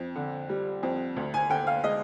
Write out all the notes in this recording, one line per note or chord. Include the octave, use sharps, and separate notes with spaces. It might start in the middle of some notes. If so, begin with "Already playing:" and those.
Already playing: F2
D3
G3
F2
D2
G#5
D3 G5
F5
G#3 D#5